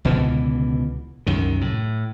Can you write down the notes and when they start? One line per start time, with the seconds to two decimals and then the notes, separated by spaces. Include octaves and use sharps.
0.05 C#2 B2 D3 E3
1.26 C2 F#2 D#3
1.61 A2